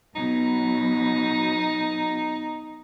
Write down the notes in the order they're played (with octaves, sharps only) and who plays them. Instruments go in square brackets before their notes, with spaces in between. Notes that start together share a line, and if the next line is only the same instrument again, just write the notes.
[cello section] B2 F#3 [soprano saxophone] D#4